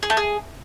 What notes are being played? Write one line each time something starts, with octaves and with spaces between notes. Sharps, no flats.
G#4
A3
G#4